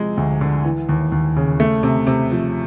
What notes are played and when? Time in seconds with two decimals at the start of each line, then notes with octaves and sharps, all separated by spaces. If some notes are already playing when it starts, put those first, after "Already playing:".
Already playing: C3 F3 G#3
0.17 D2
0.41 D3
0.65 E3
0.89 D#2
1.12 D#2
1.36 C#3
1.60 A3
1.83 C3
2.07 C3
2.31 F3